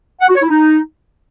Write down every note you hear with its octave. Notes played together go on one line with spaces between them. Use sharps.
F#5
F#4
C#5
E4
D#4